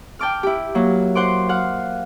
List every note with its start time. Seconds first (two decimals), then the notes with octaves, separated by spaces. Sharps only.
0.19 G5 A5 D6 F6
0.43 E4 G4
0.75 F#3 A#3
1.15 C5 F#5 C6 D6
1.49 F5 F#5